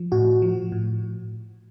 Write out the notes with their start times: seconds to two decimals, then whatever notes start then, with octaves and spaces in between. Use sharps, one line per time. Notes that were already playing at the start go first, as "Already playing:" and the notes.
Already playing: F3
0.12 A2 F#4
0.42 F3
0.72 A2